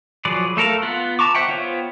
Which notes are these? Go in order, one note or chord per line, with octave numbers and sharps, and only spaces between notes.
F3 F#3 G#4 B4 D5
A3 A4 A#4 F5
B3 F4 F#5
A5 A#5 C#6 D6
C5 E5 F#5 G5
B3 F4 C5 C#5 G5